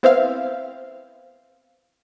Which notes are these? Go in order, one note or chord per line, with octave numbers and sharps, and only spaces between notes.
B3 C4 E4 C5 E5 F5